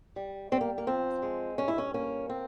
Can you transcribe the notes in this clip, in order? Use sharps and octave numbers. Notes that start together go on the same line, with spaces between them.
G3
G3 C4
A#3
A#3
F3 C4
G#3
G2 C#4
E4
C#4
A#3 C#4
C4